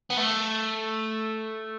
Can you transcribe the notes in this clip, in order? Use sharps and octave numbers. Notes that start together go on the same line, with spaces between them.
B3
A3